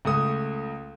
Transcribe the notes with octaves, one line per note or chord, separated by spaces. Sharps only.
C#2 A3 D#6